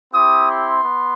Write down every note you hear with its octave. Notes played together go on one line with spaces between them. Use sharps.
C4 E4 G4 D#6
C6
B3